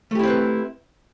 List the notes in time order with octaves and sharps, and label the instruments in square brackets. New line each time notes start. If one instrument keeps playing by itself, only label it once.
[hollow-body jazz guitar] A3
G4
E4
C4
B4